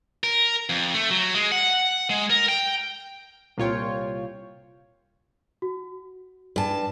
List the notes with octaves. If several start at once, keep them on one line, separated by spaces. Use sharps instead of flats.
A#4
F2
A3
F#3
G#3
F#5
G#3
A#4
G5
C2 A#2 F4 C#5 G5
F#4
G2 A5